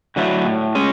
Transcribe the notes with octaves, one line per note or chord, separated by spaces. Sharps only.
D3 F#3 A3 E4
A2
G#3 C#4